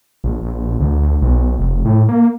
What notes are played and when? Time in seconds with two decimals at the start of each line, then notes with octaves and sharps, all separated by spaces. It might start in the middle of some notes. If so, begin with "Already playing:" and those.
0.24 A#1
0.42 A#1
0.80 D2
1.22 B1
1.59 F1
1.85 A2
2.09 A#3